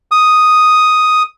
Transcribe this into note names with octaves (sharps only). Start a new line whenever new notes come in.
D#6